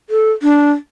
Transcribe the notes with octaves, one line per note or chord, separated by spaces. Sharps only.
A4
D4